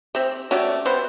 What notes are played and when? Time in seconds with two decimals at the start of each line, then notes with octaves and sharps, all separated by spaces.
0.15 C4 G4 E5
0.51 A3 C#4 F#4 G4 D5
0.85 B3 C4 C5